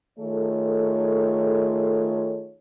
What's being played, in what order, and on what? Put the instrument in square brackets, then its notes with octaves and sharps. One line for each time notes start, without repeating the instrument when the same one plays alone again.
[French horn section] D#3 A3 F4 G#4 A4 C#5